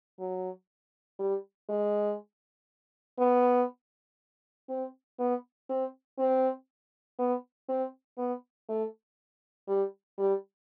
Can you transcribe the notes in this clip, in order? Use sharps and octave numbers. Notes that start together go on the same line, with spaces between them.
F#3
G3
G#3
B3
C4
B3
C4
C4
B3
C4
B3
A3
G3
G3